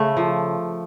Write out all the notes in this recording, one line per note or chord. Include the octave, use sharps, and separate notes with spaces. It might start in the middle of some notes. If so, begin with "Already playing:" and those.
Already playing: C#3 A3
F3